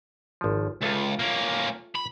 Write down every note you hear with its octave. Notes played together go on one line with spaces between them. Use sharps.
G#1 F3
C#2 F4 A4 E5
A#3 C#4
B5